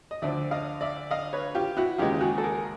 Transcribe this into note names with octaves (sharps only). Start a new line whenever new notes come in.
D#5
D2 D3 F3 D5 E5
D#5 F5
D5 E5
D#5 F5
B4 C#5
F4 G4
E4 F#4
D#2 C#3 E3 G#3 F4 G4
F#4 G#4
A4
G#4 A#4